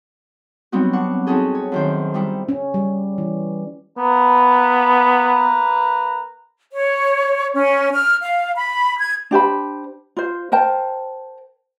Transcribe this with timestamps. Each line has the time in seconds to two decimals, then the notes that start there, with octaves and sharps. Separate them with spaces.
0.72 F#3 G3 B3 C4 D#4 F#4
0.93 D4 F#5 C#6
1.27 C4 C#4 D#4 F#4 G#4 A4
1.55 C#5
1.72 F#2 D#3 C5
2.14 G3 D#4 E4
2.49 C#4
2.74 G3
3.18 E3
3.97 A#3 B3 B4 A#5
6.72 C#5
7.53 C#4
7.92 F6
8.21 F5
8.55 B5
8.98 G#6
9.31 D4 G4 C5 B5
10.17 F4 C5
10.52 A#4 C5 G5 A5